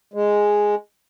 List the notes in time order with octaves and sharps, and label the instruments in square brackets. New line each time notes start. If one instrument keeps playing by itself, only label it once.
[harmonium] G#3